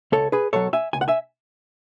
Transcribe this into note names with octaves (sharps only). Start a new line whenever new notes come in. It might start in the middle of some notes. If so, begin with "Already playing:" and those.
C#2 A4 C#5
G#4 B4
B2 F#3 A4 C#5
E5 G#5
C#2 G#5
F#5
E5 G#5